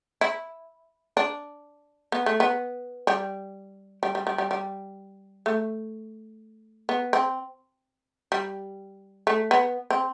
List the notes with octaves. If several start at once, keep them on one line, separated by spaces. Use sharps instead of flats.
E4
D4
B3
A3
B3
G3
G3
G3
G3
G3
G3
A3
B3
C4
G3
A3
B3
C4